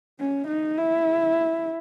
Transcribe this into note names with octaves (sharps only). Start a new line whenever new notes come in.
C#4
D#4
E4